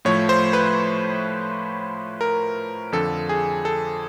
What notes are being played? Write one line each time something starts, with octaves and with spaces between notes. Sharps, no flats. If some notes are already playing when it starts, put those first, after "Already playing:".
A2 F3 A3 C#5
C5
B4
A#4
F2 D3 F3 A4
G#4
A4